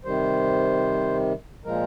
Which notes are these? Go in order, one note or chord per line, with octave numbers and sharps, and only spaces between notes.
C3 D#3 G3 C5
A#2 F3 G#3 A#4